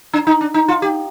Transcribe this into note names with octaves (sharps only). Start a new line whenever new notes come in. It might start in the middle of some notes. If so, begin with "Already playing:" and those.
D4
D#4
D4
D#4
F4
G4